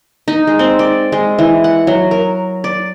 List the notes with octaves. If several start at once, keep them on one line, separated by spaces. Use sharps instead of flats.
D#4
G#3
C4
D5
G#3
E3
F#5
F#3
A#4
D5